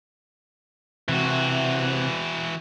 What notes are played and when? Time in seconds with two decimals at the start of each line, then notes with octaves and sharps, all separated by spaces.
1.09 C3 E3 F#4